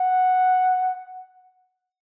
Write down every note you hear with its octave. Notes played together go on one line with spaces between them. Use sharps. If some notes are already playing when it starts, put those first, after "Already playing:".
Already playing: F#5